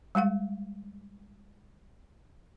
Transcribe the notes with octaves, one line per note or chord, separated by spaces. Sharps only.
G3 G#3 F5 F#5